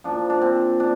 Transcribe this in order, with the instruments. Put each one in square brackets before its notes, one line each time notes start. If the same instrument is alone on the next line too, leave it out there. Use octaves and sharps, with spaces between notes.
[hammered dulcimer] A#2 F3 D4
D4
C4
D4